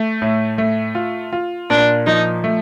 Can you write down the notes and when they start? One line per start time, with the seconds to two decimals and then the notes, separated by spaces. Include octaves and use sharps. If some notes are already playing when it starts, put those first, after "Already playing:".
Already playing: A3
0.22 A2
0.58 A3
0.95 F4
1.33 F4
1.70 A#2 D4
2.07 F3 D#4
2.44 A3